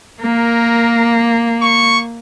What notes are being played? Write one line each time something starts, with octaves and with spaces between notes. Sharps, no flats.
A#3 A#4
C#6